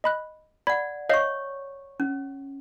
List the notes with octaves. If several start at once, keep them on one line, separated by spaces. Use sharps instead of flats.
D#5 B5 F#6
D5 F#5 B5
C#5 D#5 F5 C#6 C7
C#4